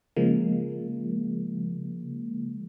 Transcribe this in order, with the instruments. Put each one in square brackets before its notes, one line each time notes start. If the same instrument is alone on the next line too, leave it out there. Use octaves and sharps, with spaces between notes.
[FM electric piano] C#3 F3 G#3 A#3